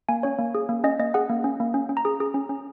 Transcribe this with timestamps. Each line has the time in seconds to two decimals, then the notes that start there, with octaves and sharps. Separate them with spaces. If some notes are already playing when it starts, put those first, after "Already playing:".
0.09 A#3 G#5
0.23 C#4 C#5
0.39 A#3
0.55 G#4
0.69 A#3
0.84 C#4 D#5
0.99 A#3 D#5
1.14 G#4 F#5
1.30 A#3
1.44 C#4
1.60 A#3
1.74 C#4
1.89 C#4
1.97 A#5
2.05 G#4
2.20 G#4
2.34 C#4
2.49 C#4